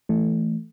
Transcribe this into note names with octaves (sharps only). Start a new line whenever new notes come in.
E3 A3